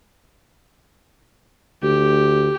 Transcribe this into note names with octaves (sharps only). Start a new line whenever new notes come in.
D2 G4